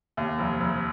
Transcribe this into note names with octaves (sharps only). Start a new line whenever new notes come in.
D#2
F1
F1